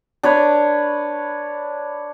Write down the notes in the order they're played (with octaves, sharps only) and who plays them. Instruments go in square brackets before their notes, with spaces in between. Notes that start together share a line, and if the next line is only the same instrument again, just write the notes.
[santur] D4 B4 C#5